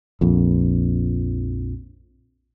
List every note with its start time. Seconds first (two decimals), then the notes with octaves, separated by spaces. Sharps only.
0.21 A#1 F2